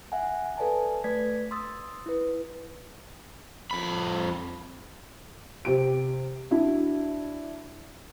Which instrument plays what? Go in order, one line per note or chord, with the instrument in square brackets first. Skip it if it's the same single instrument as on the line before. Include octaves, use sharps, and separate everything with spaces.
[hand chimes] E5 F#5 G#5
A4 B4 D5 E5 G#5 A5
A3 B4 D5 G#6 B6
C6 D#6 E6 A6
E4 B4
[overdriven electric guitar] F2 B5
[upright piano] C3 G4 D7
D4 E4 F#4